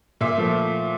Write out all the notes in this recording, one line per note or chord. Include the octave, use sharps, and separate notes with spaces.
A#2 E5
F3 A3